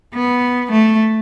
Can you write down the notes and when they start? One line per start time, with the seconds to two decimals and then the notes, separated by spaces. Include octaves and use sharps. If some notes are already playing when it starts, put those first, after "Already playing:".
0.14 B3
0.72 A3